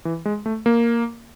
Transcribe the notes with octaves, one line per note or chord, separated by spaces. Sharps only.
E3
G#3
A3
A#3